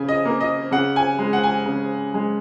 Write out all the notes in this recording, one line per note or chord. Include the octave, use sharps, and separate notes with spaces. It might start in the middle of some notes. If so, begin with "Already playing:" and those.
Already playing: C#3 G#5
D#5
A#3
D#5
C#3 F#5
G#5
G#3
F#5
G#5
C#3
G#3